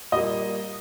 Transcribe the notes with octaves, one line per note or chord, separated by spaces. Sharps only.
A#2 G3 A#3 D#5